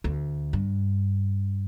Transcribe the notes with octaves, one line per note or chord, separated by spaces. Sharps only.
D2
G2